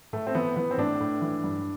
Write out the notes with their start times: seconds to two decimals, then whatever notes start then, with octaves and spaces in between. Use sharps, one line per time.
0.13 A2 A3
0.27 C4
0.35 E3 B3
0.56 E3 B3
0.71 C4
0.77 A2 D4
1.00 A2
1.22 E3
1.44 G2